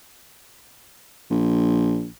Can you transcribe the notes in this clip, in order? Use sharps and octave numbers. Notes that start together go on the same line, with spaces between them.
A#1